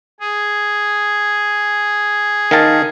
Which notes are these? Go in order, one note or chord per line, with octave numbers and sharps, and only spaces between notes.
G#4
D#3 F5 A5